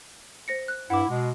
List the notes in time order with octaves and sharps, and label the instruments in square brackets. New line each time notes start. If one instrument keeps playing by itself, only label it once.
[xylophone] C5 A#6 C#7
F#6
[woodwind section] G2 E4 [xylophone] F#5 D6
[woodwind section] B2 G#3